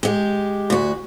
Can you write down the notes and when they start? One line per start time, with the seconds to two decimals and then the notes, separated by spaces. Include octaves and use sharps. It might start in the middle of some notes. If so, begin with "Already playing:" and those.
0.03 G#3 G4
0.70 D2 F#4